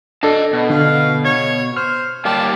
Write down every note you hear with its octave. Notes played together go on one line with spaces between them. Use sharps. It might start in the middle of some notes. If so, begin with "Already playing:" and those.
D4 A4 D#5 A5
B2
D3 F5
C#5 G#6
C5 F6
G3 A#3 G4 A5